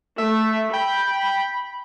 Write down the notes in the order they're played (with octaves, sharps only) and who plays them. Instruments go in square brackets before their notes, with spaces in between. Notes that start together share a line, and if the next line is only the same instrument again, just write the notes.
[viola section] A3 [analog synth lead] E5
[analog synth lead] G5 [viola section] B5